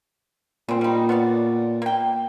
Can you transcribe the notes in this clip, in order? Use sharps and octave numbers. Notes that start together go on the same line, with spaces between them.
A#2 C#3 C4
G3 D#4
B3 C#5 D5
A#3 G5